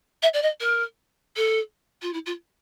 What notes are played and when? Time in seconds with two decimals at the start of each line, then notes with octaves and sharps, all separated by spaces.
0.22 E5
0.33 D5
0.42 D#5
0.60 A#4
1.36 A4
2.02 F4
2.13 E4
2.26 F4